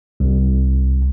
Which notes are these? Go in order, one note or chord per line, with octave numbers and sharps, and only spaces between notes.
C2